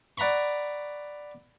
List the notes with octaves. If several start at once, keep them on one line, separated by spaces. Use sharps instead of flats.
D5 F#5 A#5 B5 C#6